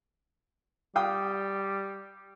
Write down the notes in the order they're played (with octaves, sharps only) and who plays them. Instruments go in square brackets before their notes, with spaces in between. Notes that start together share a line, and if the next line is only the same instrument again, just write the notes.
[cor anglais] G3 [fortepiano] F5 G5 D#6